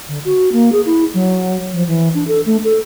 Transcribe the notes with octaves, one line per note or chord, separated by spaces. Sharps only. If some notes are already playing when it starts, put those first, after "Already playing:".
D3
F#4
A#3
G#4
E4
F#3
F3
E3
D4
A4
A3
A4